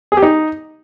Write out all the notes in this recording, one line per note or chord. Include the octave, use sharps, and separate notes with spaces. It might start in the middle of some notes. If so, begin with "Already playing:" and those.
G#4
G4
D#4